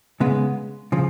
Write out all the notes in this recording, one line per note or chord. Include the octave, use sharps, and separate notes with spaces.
C#3 G#3 B3
C#3 F3